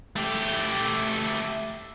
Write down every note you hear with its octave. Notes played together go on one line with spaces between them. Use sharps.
A3 G4